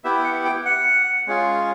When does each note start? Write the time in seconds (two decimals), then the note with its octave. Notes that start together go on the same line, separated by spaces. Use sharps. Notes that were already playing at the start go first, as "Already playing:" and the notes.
0.04 B3 E4 G4 E5
0.24 F#5
0.45 G5
0.65 F#5
1.27 G#3 C#4 F4 G#4